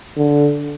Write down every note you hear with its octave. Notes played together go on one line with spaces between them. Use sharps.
D3